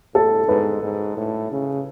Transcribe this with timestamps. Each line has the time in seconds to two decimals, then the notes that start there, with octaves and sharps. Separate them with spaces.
0.15 A2 A4
0.48 G#2 B4
0.83 G#2
1.16 A2
1.52 C#3